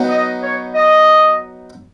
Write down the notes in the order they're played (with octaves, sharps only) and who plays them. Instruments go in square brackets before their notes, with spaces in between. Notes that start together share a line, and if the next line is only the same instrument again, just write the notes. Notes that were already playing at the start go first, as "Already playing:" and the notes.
Already playing: [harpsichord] F#3 B3 D#4 F#4
[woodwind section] D#5
C#5
D#5